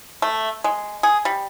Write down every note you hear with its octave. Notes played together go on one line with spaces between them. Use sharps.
A3
G#3
G#4
G3